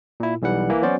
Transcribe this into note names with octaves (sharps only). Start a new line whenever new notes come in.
A#2 E4
B1 E3 G3 F#5
E3 A#3
F#3 B3 C#4 F#4 C5 D5